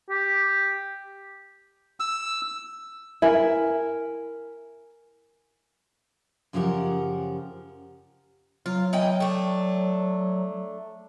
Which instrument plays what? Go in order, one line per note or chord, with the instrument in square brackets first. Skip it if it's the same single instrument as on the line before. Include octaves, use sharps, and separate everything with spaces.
[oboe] G4
[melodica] E6
[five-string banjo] E4 [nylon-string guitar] A#4 G#5
[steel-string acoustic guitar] F#2 C#3 F3 G4 A#4 F#5
[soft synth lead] F#3 [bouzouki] F4
[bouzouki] E3 D#5 G5
A3 D4